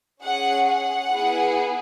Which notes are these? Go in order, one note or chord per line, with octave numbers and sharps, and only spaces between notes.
C#4 G#4 F#5
F#5
B3 E4 G#4